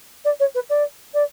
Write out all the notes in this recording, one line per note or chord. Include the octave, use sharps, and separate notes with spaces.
D5
C#5
B4
D5
D5